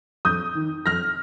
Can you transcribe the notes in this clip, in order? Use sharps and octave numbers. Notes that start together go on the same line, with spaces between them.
F2 D#6 G6
D#3
F2 F6 A#6